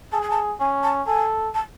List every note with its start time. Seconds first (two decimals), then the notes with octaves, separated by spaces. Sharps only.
0.12 G#4 A5
0.22 G#5
0.30 A5
0.60 C#4 G#5
0.83 A5
1.07 A4 G#5
1.54 A5